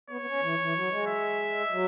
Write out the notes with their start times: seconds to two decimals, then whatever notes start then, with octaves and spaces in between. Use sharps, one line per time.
0.10 B3 C#5
0.21 B3
0.26 C#4
0.42 E3
0.59 E3
0.74 F#3
0.90 G#3
1.07 E5
1.71 F#3